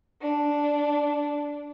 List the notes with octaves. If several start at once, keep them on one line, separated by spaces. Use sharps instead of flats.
D4